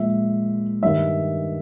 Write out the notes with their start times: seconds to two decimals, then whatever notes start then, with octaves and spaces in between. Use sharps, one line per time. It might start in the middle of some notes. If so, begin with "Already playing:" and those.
Already playing: A#2 F3 G#3 E5
0.82 G2 D#3 G3 E5